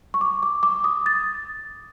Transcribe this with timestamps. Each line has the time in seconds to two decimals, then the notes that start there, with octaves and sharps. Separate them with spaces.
0.14 C#6
0.21 D6
0.43 D6
0.63 D6
0.84 D#6
1.06 A6